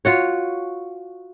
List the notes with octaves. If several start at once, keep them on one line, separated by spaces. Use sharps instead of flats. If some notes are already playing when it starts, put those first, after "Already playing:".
F4 F#4 C#5